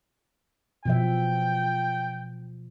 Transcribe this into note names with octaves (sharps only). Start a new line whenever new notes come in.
B2 F3 E5 G5